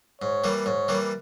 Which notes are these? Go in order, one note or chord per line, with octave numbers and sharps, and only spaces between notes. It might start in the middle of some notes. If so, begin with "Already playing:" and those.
G#2 C#5
E3 G3 A#3
G#2 C#5
E3 G3 A#3